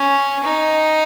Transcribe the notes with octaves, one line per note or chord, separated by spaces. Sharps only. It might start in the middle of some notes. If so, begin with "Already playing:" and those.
Already playing: C#4
D#4